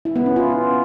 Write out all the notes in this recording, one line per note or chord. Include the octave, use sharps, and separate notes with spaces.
E4
B3
C#4
F4